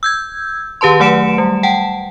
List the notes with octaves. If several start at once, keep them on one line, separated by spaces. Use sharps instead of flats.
E6 G6 G#6
D#3 G4 B4 A5 C6
F#3 A3 F#5 C#7 D7 E7
G3
F#5 G5 A5